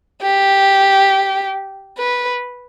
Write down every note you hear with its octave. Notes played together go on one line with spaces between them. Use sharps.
G4
B4